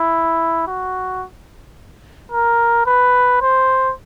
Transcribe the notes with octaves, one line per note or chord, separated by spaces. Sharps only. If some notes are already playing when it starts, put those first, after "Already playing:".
Already playing: E4
F#4
A#4
B4
C5